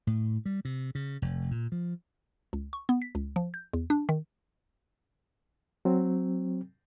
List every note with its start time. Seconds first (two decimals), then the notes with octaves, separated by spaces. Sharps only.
0.07 A2
0.46 G3
0.65 C3
0.95 C#3
1.22 F1
1.51 A#2
1.72 F3
2.53 C#2
2.73 C#6
2.89 B3
3.02 B6
3.15 C#2
3.36 F3
3.54 G6
3.73 E2
3.90 D4
4.09 D#3
5.85 F#3 C4